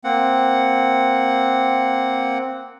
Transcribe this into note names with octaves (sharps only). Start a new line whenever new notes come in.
A#3 C4 F#5